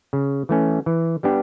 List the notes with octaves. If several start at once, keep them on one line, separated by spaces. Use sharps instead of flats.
C#3
E3 A3 C#4
E3
G3 B3 D4 G4